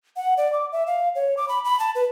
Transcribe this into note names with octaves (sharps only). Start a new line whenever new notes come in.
F#5
D5
D6
E5
F5
C#5
D6
B5
B5
A5
B4